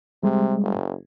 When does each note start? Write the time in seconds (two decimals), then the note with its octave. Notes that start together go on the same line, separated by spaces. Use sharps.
0.23 C3 G3 G#3
0.63 F#1